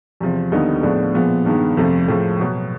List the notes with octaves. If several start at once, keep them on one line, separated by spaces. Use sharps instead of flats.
E2 C3 F3
D#2 D3 G3 B3 D#4
A2 F3 G#3 B3 D4
A#2 F3 G#3 B3
G2 D#3 G#3 B3
F2 C3 F3 A3
A2 F3 G#3
B2 F#3 B3